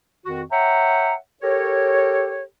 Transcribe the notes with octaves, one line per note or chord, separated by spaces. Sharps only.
F2 D#3 F#4
C#5 E5 F#5 G5 A#5
G4 A4 A#4 C#5